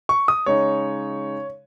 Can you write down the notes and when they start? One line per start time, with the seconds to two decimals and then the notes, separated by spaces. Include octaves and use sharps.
0.09 C#6
0.28 D#6
0.46 C#3 G#3 D#4 C#5